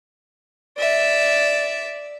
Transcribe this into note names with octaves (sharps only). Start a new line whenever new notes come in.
D5 E5